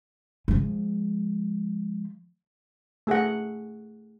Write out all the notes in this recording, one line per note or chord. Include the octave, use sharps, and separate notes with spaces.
F3 G#3
A3 G#4 E5 F#5